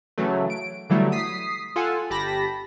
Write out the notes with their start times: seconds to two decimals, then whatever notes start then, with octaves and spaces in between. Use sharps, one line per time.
0.18 C#3 E3 F#3 A3
0.50 D7
0.90 D3 E3 F#3 G3 A3 B3
1.12 D#6 B6 C7
1.76 F4 A4 F#5 G#5
2.10 G1 G4 A5 B5 A#6